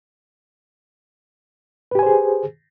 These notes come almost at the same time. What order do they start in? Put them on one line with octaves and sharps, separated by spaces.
B4 G4 G#5 C5 G#4